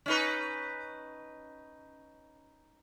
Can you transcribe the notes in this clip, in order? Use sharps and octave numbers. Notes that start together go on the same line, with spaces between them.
C#4 D#4 B4